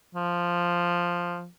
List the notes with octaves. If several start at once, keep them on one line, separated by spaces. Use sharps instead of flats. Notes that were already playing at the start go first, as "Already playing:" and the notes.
F3